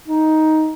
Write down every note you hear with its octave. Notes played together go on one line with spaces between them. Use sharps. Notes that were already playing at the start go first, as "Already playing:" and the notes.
D#4